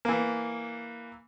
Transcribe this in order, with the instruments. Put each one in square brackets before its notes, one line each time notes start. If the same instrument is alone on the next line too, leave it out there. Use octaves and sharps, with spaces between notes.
[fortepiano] E3 A#3